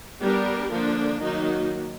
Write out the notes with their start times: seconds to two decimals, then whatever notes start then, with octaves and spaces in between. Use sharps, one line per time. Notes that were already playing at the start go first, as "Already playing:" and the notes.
0.21 G3 B3 D4 G4 A#4
0.71 D3 F3 A#3 D4
1.21 D#3 F#3 A#3 D#4 F#4